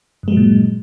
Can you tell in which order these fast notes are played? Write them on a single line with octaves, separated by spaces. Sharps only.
G2 G#3 F#3 A#2